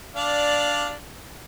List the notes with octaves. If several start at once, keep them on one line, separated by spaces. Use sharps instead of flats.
D4 D5 F5